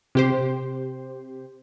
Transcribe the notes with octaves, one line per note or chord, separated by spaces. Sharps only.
C3 G4 C5